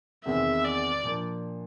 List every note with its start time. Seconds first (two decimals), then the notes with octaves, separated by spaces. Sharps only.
0.25 E2 C3 D#3 G#3 C4 E5
0.64 D5
1.03 A#2 F3 A#3 D4